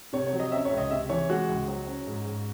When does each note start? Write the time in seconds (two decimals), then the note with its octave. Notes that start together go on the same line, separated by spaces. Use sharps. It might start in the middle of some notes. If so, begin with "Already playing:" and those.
0.13 C3 C#5
0.27 C#5
0.32 F#3
0.40 D#5
0.52 C#4 E5
0.65 C#5
0.71 C#2
0.78 D#5
0.90 C3 E5
1.09 E3 C#5
1.29 G#3 F#4
1.49 C#2
1.68 F#3
1.87 C#4
2.07 G#2
2.25 G#2